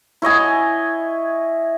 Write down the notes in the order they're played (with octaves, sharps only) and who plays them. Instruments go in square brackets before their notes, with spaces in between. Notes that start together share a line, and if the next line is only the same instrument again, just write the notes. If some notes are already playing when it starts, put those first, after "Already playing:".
[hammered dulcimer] E4 C#5 D#5 G#5